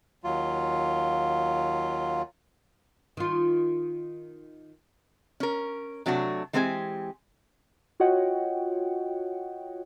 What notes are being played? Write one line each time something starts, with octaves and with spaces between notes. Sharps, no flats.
D#2 F#3 F4
D#3 F4
C#4 A#4
C3 F#3 A3 D4 F#4
E3 G#3 C4 G4 A#4 G#5
F4 F#4 C#5 D#5 F#5 G5